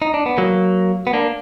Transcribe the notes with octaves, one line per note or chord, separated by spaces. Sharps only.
D#4
D4
B3
F#3 A#3
B3
A#3 D4